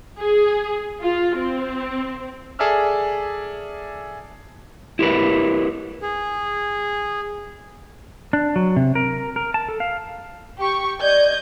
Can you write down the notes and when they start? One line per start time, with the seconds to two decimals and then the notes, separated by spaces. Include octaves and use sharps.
0.21 G#4
1.02 F4
1.38 C4
2.59 G#4 A4 D5 E5 E6 F6
4.99 E4 G4 A#4 B4
6.02 G#4
8.33 D4
8.56 F#3
8.76 C3
8.95 A#4
9.36 A#4
9.54 A5
9.69 A4
9.80 F5
10.57 G4 C#6
11.01 D5 D#5 G6 G#6